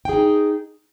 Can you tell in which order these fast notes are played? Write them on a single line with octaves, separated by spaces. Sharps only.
G5 G#4 D#4